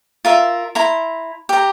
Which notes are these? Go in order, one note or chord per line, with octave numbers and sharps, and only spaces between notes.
F4 A#4 E5
E4 A#5 C6
G4 A#5